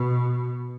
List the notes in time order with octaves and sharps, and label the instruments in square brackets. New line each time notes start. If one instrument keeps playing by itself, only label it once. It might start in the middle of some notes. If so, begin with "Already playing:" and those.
Already playing: [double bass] B2